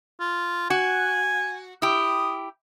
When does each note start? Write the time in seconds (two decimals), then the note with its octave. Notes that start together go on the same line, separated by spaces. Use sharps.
0.20 F4
0.70 F#4 G#5
1.82 E4 G4 D#6